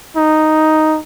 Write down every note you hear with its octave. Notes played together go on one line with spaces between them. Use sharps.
D#4